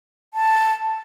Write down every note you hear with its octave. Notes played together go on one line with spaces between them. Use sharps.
A5